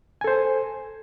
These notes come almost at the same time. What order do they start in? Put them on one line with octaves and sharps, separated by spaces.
G#5 A4 C5